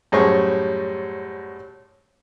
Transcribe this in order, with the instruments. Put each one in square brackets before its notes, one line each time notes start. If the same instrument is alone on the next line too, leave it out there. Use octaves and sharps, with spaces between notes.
[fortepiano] F#2 A2 G3 G#4 C5 C#6